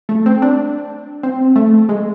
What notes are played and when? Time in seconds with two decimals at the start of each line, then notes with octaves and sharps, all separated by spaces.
0.09 A3
0.26 C4
0.42 D4
1.23 C4
1.56 A3
1.89 G#3